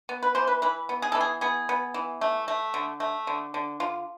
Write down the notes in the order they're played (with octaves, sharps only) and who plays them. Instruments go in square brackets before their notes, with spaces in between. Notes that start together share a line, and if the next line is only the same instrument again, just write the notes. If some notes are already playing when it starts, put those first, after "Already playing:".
[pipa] B3
B4
E3 C5
B4
E3 B4
B3
G#4
E3 A4
G#4
B3 G#4
B3
E3
A3
A3
D3
A3
D3
D3
D3 F4